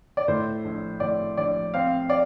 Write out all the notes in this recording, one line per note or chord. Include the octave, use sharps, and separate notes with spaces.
D5
A2 C5
A#1
A2 D5
A#1 D5
C4 F5
D5